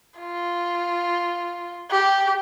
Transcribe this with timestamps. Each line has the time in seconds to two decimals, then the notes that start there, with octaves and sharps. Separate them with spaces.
0.20 F4
1.91 G4